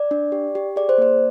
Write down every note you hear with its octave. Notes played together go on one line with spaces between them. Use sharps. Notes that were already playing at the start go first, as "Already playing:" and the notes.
Already playing: D5
D4
G4
G4
G#4 D5
C5
A#3 D5